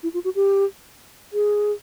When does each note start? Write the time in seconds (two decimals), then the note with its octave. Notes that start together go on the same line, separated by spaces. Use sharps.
0.03 E4
0.14 F4
0.24 F#4
0.35 G4
1.33 G#4